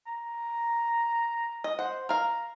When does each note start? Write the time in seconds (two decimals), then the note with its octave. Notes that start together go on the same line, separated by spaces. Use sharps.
0.07 A#5
1.64 D#5
1.79 C5 F#5
2.09 A#4 F5 A#5